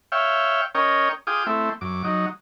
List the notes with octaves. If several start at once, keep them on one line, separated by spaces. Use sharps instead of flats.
C#5 E5 F5 G5
C#4 A#4 C#5 D#5 G5
F4 G#4 G5 D6 D#6
A3 C4 E4
F#2 D6
F#3 D#4